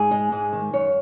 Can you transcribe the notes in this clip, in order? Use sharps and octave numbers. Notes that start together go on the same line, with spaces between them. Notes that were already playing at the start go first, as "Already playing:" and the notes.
Already playing: G#2 G#4
G#3
G#2
D#3
F#2 C#5